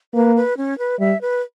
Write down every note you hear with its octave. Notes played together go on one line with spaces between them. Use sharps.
A#3 B4
B4
C#4
B4
G3 E5
B4